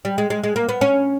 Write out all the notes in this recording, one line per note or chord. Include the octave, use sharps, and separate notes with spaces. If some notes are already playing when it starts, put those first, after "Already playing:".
G3
G#3
G#3
G#3
A#3
B3
C#4